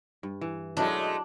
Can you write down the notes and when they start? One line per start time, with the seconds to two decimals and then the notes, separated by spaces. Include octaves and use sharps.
0.23 G2
0.41 E3
0.77 B2 F#3 G#3 A3 D4 E4